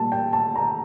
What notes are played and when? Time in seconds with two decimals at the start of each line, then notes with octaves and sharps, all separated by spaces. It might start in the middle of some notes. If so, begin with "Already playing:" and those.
Already playing: A#2 G3 A5
0.12 G5
0.33 A5
0.56 A#5